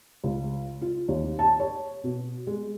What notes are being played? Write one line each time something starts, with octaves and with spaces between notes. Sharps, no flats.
C#2
F4
D#2
A5
C#5
B2
G#3